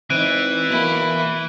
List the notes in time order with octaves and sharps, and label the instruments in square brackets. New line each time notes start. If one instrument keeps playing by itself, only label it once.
[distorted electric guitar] E3 [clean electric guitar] C4 D#4 [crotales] F#6 D7 D#7
[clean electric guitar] B2 F#3 A#3 [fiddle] E4